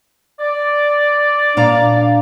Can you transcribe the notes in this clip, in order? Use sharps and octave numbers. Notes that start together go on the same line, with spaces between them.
D5
A#2 D4 F5 A#5